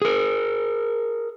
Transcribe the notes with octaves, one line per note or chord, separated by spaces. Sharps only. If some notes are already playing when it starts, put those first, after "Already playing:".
G#4 A#4